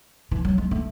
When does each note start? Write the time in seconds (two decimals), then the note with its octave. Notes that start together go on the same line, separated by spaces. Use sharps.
0.31 E3
0.45 F#3
0.58 G#3
0.71 A3